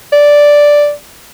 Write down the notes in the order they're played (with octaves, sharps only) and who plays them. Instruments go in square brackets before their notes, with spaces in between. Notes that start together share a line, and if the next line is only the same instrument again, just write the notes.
[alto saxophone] D5